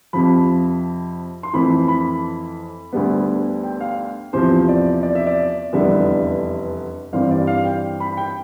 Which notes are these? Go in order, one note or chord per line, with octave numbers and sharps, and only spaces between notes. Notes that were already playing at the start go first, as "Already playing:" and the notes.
F2 C3 F3 B5
C6
F2 E3 A3 C4 B5
B5
D2 D3 G3 B3
G5
F5
E2 C3 F3 C5
D5
D5
E5
D5
F1 E2 D3 G3 B3 E5
G2 E3 G3 C4 F5
D5
F5
G5
B5
G5